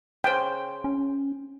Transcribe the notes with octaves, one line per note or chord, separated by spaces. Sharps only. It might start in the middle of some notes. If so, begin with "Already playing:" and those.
C#3 C5 G5
C#4